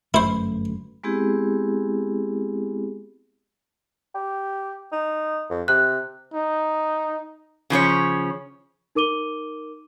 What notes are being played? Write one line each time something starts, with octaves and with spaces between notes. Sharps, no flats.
G1 F#2 A3 E4 B4 C5 B5
G#3 B3 C4 E4 G4 G#4
G4
D#4
F2
C3 F#6
D#4
C#3 F3 C#4 C#5
D#4 A#4 D6 D#7 G7